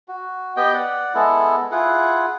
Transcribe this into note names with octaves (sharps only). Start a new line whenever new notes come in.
F#4
B3 G4 D#5 G5
D5 F#5
G#3 B3 E4 A4
E4 F4 G#4 F#5